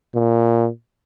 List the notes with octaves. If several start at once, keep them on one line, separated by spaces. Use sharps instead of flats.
A#2